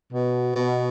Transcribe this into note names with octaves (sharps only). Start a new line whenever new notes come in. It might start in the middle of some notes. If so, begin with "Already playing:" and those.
B2
B2